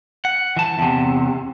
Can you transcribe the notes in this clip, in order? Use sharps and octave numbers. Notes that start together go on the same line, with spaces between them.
F#5
E3 A5
E2 C3